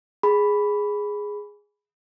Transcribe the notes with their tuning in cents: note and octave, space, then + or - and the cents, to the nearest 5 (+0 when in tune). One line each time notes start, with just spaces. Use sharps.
G#4 +0 B5 +0